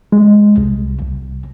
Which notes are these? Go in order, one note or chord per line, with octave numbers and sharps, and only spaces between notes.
G#3
C2
C2